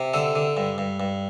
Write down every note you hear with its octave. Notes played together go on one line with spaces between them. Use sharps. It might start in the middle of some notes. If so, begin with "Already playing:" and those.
Already playing: C3
D3 A4
D3
G2
G2
G2